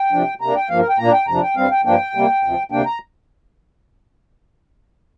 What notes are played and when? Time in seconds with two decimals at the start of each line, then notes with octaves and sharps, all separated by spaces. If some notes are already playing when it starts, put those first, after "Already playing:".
Already playing: G5
0.12 C3 F3 D4
0.41 C3 A#3 D4 A#5
0.56 G5
0.69 G2 F3 A#3 F5
0.79 A#4
0.89 G5
0.98 A#2 A#3 D4 A#5
1.13 G5
1.27 F2 C3 F3 D4 A#5
1.42 G5
1.56 G2 G3 C4 F5
1.71 G5
1.85 G2 F3 A#3 D4 G5
2.15 C3 G3 A#3
2.43 D2 C3 F3
2.71 D2 C3 A#3 D4 G5
2.86 A#5